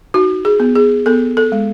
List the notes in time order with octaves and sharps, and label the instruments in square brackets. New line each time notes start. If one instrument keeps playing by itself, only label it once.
[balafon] D#4 F#4
G#4
B3
G#4
B3 A4
A4
G#3